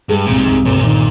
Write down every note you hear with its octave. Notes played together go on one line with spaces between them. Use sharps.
G2 G#3
C2 A#2
G#2
C2
G1 A#2
C3
A#2 D#3